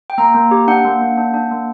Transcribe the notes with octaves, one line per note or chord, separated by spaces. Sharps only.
G5
A#3 A#5
A#3
G4
D4 F#5
A#3
A#3
D4
D4
A#3